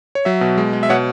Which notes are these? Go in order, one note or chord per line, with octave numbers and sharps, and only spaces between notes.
C#5
F#3 E5
B2
G#3
G#3
E5
B2 C#5 F#5